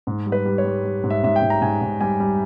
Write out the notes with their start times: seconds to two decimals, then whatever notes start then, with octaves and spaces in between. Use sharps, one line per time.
0.07 G#2
0.26 G3
0.32 B4
0.45 G3
0.58 C#5
0.65 G3
0.84 G3
1.04 G#2
1.10 E5
1.23 G#2 E5
1.36 G5
1.42 G#2
1.50 A#5
1.62 G#2 G#5
1.81 G#2
2.01 G3 G#5
2.20 G3